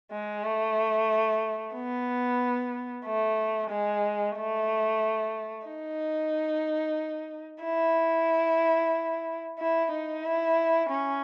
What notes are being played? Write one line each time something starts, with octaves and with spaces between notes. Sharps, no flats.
G#3
A3
B3
A3
G#3
A3
D#4
E4
E4
D#4
E4
C#4